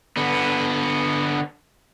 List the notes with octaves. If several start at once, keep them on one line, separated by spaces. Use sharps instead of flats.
D3 B3